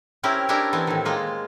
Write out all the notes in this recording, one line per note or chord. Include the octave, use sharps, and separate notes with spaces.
C4 C#4 E4 G4 A#4
C#4 D4 E4 G4 A#4 G5
E3 B3 C4
A2 D#3
G#3 A#3 F4